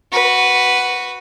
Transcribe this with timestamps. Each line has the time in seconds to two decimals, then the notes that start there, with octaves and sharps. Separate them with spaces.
0.12 F#4 B4